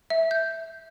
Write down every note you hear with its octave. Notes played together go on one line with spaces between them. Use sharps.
E5
G6